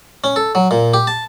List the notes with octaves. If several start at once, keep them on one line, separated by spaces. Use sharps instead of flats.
C#4
A4
F#3
A#2
G4
A5